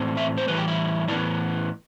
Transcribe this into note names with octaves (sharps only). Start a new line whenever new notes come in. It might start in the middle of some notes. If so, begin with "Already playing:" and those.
Already playing: A2 E3 A3 C4
E5
C5
A2 E3 G3 B4
G4
E4
A2 E3 B3 D4